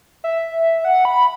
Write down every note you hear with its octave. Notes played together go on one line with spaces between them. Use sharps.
E5
F#5
B5